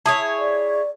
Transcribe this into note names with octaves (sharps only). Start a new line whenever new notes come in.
E4 G#4 C#5 A5 D#6
D5